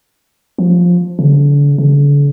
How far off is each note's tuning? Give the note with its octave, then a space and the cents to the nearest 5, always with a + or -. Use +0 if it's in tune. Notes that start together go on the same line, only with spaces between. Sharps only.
F3 +10
D3 -40
D3 -45